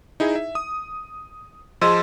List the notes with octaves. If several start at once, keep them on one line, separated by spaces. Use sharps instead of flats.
D#4 E4 G#4
E5
D#6
F3 G#4 D#5 C6 E6